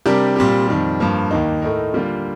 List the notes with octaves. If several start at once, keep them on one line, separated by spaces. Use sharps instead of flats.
C3 G3 D4 G4 A#4
A#2 G3 C4 G4
F2 D#3 G3
G2 F3 A#3
D#2 D#3 A#3 D#4
A2 A3 D#4 A#4
D3 G3 A#3 F4